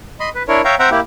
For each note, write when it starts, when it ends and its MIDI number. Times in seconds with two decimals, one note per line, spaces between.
0.20 0.29 75
0.20 0.29 83
0.20 0.29 84
0.35 0.43 71
0.48 0.61 62
0.48 0.61 64
0.48 0.61 70
0.48 0.61 73
0.65 0.75 73
0.65 0.75 76
0.65 0.75 77
0.65 0.75 79
0.65 0.75 82
0.79 0.89 60
0.79 0.89 72
0.79 0.89 76
0.79 0.89 78
0.79 0.89 79
0.79 0.89 82
0.91 1.00 58
0.91 1.00 64
0.91 1.00 67